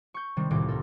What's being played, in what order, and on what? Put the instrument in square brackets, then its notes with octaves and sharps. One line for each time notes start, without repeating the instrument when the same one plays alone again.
[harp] C#6 G6
C3 D#3 G3 C4
D#1 C2 A2 C3 G4 D6
A4 A#4